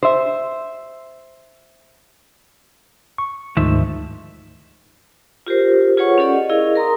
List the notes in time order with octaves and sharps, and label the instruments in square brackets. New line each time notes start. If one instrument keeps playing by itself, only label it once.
[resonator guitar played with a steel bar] C5 E5
[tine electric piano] C#6
[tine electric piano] D2 G#2 [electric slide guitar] D#3 F3 E5
[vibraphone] F4 G4 A#4 C5
F4 G#4 B4 C#5 F#5 C#6
C#4 G4 A4 D5 F#5
D#5
E4 G#4 A#4 D#5 F5
A#4 A#5 C6 D#6